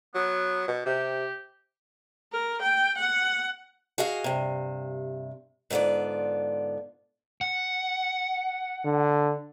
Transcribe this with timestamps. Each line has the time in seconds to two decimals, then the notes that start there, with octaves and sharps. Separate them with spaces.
0.15 F#3 B3
0.68 B2
0.86 C3 G4
2.32 A#4
2.62 G5
2.98 F#5
3.98 F#4 G#4 D#5 F5
4.24 G2 C3
5.70 G#2 D3 B3 F4 D5
7.41 F#5
8.85 D3